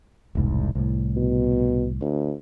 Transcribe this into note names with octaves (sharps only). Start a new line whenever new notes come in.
E1 C2 G#2
C2 A2
B2
D2